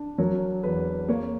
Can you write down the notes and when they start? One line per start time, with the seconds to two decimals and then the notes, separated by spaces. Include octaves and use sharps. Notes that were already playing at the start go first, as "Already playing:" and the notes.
Already playing: D4
0.18 F#3 A#4
0.63 E2 B4
1.08 A#3 C#5